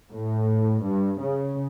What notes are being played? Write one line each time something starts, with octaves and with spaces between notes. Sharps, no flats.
A2
G2
C#3